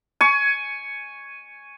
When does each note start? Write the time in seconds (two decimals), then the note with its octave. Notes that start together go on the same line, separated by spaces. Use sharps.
0.21 G#5 C#6